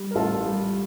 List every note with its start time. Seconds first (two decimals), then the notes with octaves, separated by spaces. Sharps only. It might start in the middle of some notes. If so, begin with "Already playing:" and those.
Already playing: G3
0.11 A#4
0.15 A1 F4 A4
0.45 G3